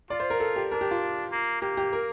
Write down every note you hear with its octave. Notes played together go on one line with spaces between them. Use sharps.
F4 D5
C5
A#4
A4
G4
D4 A#4
G4
F4
A#3
A#3 G4
G4
A#4